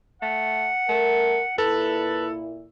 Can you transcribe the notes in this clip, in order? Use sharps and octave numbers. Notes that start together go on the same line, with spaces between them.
A3 F#5
A3 A#4
A#2 E4 A4 B4 A5